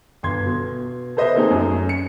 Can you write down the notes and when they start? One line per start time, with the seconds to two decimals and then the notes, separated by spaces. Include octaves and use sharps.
0.23 G1 C6 G#6
0.46 B2
1.17 A4 B4 C5 D#5 E5
1.36 A3 A#3 C4 D#4 G#4 A4
1.51 F#2
1.89 C#7